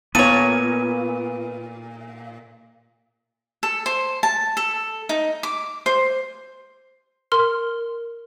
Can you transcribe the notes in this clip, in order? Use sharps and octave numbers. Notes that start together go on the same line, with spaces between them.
A#2 B3 A4 C#5 D#7
A4
C5
A5
A4
D#4
D6
C5
A#4 C6 F6